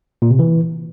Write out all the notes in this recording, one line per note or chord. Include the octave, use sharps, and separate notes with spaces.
A#2
C3
E3